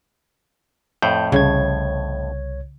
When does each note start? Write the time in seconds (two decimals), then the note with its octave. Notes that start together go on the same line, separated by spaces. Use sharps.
1.02 F2 A2 G6
1.32 C2 C#3 C#5 G#6